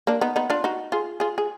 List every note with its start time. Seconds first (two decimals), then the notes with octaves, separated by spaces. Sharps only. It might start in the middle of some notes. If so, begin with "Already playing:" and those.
0.07 A#3 D4
0.21 B3 D#4
0.36 B3 D#4
0.50 D4 F4
0.64 D#4 F#4
0.92 F4 G#4
1.20 F4 G#4
1.38 G#4